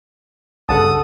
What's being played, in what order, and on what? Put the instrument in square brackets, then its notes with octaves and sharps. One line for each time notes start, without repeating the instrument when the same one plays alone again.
[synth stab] B1 G2 C#3 [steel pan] A4 F#5 A5 [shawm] D#6